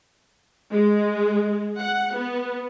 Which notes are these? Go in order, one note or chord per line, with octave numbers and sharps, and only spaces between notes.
G#3
F#5
B3